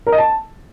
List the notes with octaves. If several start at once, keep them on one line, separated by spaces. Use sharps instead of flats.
A#4
D#5
A5